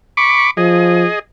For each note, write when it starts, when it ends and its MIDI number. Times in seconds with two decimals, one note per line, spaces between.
0.17 0.51 83
0.17 0.51 85
0.17 0.51 86
0.57 1.04 53
0.57 1.19 68
0.57 1.19 75